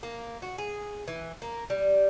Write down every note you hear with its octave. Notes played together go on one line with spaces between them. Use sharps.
A#3
F#4
G#4
E3
A#3
G3